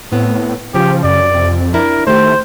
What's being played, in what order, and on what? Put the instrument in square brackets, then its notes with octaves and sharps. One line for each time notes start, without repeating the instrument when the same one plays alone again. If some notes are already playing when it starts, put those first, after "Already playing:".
[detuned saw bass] A2 [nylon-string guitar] B3 C4
[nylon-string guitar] C#3 [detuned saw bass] F3 [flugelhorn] G4
[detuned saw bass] F#2 [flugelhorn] D5
[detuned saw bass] F2 [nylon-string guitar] C3
[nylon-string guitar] D4 E4 [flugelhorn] A#4
[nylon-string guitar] D#3 G4 [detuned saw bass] A3 [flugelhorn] C5